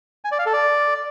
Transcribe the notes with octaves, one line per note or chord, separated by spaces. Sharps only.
G#5
D5
F5
A4
D5